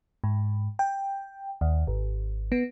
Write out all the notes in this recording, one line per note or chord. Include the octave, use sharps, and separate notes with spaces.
G#2
G5
D#2
G#1
B3